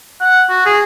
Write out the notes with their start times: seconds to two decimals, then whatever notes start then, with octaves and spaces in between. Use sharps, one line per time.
0.21 F#5
0.49 F#4
0.66 G#4